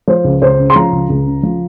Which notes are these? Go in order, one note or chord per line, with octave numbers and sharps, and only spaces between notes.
F3 C5
C#2
C#2 C5
C#3
C6
F3 A#5
C#2
C#2
C#3
F3